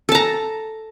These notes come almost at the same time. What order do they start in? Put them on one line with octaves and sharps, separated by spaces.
A4 A5 A#5